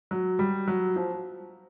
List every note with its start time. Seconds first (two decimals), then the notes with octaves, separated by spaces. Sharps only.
0.11 F#3
0.39 G3
0.68 F#3
0.96 F3